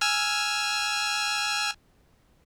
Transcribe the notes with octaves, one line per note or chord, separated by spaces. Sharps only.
G#5 E6 F6